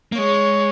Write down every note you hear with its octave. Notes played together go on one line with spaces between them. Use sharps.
A#3
G#3 C#5